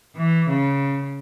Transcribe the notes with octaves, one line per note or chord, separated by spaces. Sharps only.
E3
C#3